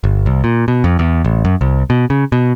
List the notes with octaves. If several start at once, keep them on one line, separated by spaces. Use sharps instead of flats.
G1
C2
A#2
B2
F2
E2
A1
F#2
C2
B2
C#3
B2